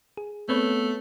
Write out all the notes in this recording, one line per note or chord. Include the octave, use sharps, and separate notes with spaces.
G#4
A3 B3 C4 B4 C#5